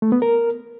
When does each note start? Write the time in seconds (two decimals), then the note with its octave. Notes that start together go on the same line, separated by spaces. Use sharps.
0.02 A3
0.12 B3
0.22 A#4